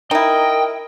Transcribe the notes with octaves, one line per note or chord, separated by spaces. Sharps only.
D#4 E4 A#4 D#5 G5